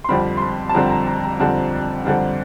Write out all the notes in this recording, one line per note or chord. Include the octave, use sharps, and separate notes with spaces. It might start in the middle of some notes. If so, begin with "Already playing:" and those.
C6
F2 D3 G3 C4 B5
C6
B5
A5
F2 D3 G3 C4 A#5
A#5
A#5
A#5
F2 D3 G3 C4 A5
F2 D3 G3 C4